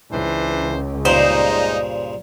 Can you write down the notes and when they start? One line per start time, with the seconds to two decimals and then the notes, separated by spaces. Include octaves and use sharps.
0.11 C#2 E3 D4 C5
1.05 G2 A#2 C#3 G#3 D#4 C5